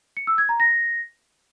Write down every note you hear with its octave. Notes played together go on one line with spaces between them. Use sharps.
C#7
E6
G#6
A#5
A#6